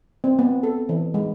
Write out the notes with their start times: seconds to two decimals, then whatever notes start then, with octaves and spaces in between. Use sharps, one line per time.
0.24 C4
0.39 B3
0.63 A4
0.89 E3
1.14 G#3